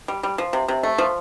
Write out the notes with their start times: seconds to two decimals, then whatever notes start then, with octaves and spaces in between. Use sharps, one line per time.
0.08 G3
0.23 G3
0.38 F3
0.53 C3
0.68 C3
0.83 A3
0.98 F3